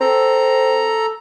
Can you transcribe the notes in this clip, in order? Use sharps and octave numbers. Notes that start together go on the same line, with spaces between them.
C4 A4 A#5